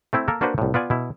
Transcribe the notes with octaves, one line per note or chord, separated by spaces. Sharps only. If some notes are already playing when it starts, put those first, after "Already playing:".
A3 C4 E4
A#3 A4 A#4
A#3 D4 F#4 B4 C5
C2 A2
B3 F4 D5 G#5
B2 E4